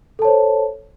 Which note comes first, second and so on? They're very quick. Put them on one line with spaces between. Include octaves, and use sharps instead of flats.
A4 A5 C#5 C5